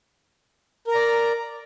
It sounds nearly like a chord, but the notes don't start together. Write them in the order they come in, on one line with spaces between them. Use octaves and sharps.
A#4 A#5 D5